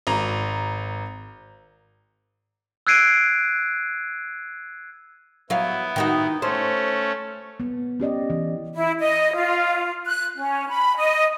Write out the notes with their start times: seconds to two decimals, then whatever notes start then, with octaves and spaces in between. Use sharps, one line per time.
0.07 G#1 A#5
2.87 E6 F#6 G#6 C7 D7 D#7
5.50 F#3 B3 E4 F5
5.96 D#3 D#4 F#4
6.42 A3 C#4 C5
7.60 B3
8.00 C#4 G4 D5 D#5
8.30 E3
8.75 E4
9.00 D#5
9.35 F4
10.06 F#6
10.36 C#4
10.69 B5
10.97 D#5